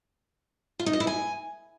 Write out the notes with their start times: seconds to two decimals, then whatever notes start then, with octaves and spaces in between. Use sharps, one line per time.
0.79 F4
0.86 D#4
0.93 D#5
1.00 E4
1.07 G#5